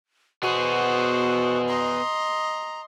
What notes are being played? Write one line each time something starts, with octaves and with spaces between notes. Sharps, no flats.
B2 B3 F#4 G#4 C5
D#5 A#5 C6